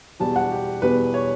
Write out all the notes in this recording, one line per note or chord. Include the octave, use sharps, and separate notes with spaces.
E2 B2 G3 A5
F#5
G4
E2 B2 G3 B4
C#5